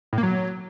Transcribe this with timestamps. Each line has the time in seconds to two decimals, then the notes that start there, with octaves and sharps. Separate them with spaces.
0.13 A2
0.18 A#3
0.23 F#3